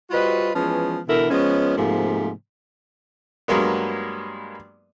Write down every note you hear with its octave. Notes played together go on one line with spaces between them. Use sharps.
G3 F4 F#4 B4 C5 D#5
E3 F3 G#3 B3 C#4
B2 D3 E3 E4 A4 A#4
F3 G#3 B3 C#4
G#2 C3 F3 A3 A#3
G2 F#3 G#3 A#3 B3